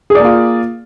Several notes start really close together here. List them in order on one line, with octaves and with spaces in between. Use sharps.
G#4 D5 A#3 F4